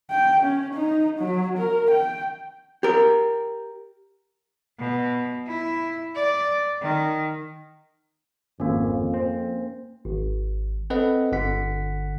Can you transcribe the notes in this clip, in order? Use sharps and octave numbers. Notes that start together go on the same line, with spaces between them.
G5
C#4
D#4
F#3
A#4
G5
G4 A#4
B2
E4
D5
D#3
G#1 F2 A#3 C#4
C4
G#1
C4 A4 B4 D#5 F#5
G1 D3 F#5 B6